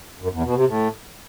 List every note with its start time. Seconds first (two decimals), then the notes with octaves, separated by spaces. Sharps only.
0.20 F#2
0.32 E2
0.43 B2
0.55 C3
0.66 A2